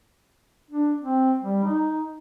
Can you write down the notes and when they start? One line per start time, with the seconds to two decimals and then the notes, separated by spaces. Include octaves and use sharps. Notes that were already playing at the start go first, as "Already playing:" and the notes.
0.71 D4
1.02 C4
1.42 G3
1.64 D#4